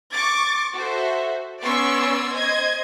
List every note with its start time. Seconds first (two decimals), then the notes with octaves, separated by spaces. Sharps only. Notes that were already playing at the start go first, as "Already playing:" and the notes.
0.12 C#6 D6 A6
0.75 F#4 A4 C5 E5
1.60 B3 C#4 D5 C6 C#6 E6
2.33 C5 D#5 G#6